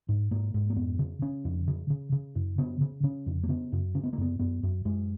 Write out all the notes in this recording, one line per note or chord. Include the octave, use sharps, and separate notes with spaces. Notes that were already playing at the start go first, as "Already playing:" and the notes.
G#2
G#2 A#3
G#2
A#3
F2 B3
C#3
C#3 C#4
F2
C#3
C#3
C#3
F#2
C#3 B3
C#3
C#3 C#4
F2
A#3
C#3 B3
F#2
C#3 C#4
B3
A#3
F#2 B3
F#2 B3
F#2
F#2 G#3